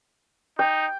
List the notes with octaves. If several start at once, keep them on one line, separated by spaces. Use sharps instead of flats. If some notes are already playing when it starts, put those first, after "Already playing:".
D#4 G5